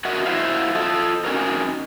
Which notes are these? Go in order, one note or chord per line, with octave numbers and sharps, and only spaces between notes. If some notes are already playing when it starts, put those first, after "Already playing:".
F#4 A#4 D#5 E5 F#5
E4 F#4 C5 E5 F5
F4 A4 D#5
C4 C#4 D#4 F#4 A#4